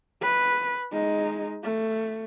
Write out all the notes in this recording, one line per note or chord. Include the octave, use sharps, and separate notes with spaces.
B4
G#3 D#4
A3